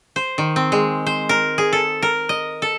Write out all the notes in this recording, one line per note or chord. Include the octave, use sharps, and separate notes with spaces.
C5
D#3
C4
G#3
C5
A#4
G#4
A4
A#4
D#5
A4